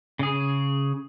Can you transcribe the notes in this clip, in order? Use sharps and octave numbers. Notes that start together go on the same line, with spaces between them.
C#3 G#4